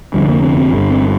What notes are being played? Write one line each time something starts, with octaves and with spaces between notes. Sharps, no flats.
F1 F2 D3 G3
A#3
C4
C4
G1 G2 D3 G3
C4